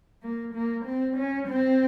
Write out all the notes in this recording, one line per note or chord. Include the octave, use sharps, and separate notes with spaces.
A#3
A#3
C4
C#4
C4